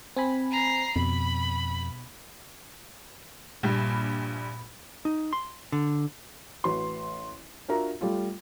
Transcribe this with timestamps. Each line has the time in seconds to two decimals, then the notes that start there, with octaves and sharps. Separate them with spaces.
0.17 C4 G#5 B5
0.51 A#5 C7
0.96 F2 B2 B5
3.63 A#1 G2 A#2 G3 B5
5.05 D#4
5.33 C6
5.72 D3
6.64 A1 F#4 B4 C6
7.68 D4 F4 F#4 A#4 E5 A#5
8.01 G3 A3 F4